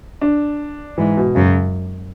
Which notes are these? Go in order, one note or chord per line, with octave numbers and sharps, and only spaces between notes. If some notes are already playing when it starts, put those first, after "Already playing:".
D4
G#2 E3
B2
F#2 C#3